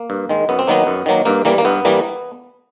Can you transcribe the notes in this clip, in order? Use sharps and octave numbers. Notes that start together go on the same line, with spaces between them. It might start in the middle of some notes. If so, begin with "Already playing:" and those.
Already playing: A#3
G2
D#3 G#3
F#2 B3
C4
D#3 F#3 A#3 B3
F#2
D#3 F#3 A#3
G2 A#3
E3 G3 A#3
A#3
G2 B3
E3 G3 A#3